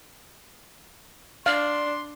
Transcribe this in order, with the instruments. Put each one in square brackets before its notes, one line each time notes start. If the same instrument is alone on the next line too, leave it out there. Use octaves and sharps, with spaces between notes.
[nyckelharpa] D4 [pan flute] D5 [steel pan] F5 [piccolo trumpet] C6